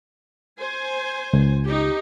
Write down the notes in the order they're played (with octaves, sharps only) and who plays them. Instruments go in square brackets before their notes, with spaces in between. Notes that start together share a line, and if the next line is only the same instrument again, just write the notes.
[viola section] C5 G#5
[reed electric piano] C#2
[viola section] D#4 G4